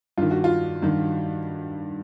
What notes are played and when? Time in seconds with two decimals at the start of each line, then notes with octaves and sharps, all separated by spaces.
0.18 G2 D#3 F4
0.31 F#4
0.44 F4
0.82 G2 D#3